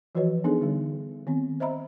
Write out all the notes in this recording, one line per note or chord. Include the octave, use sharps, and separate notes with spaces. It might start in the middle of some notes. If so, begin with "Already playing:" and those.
E3 F3 F#4 B4 C#5 D#5
B3 D4 D#4 G#4 A4
D3 G3
D#3 B3 C4
C5 D#5 E5 A#5 B5